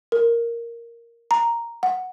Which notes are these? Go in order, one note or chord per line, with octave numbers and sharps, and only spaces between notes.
A#4
A#5
F#5